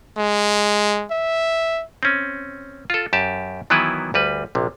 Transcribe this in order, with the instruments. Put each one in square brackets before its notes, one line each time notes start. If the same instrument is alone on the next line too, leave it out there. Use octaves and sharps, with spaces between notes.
[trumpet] G#3
E5
[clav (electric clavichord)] C4 C#4
F4 A4
F#2 G4 A5
D#3 E3 F#3 B3 E4 B4
D2 G3 B4
A#1 C3